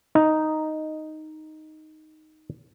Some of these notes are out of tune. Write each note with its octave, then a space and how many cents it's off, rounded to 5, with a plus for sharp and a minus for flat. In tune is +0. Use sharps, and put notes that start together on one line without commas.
D#4 +0